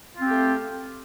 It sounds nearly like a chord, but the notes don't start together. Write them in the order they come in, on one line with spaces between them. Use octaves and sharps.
F4 C4 G4 A3